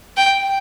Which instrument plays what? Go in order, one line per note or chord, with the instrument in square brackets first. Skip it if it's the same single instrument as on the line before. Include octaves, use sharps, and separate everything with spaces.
[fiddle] G5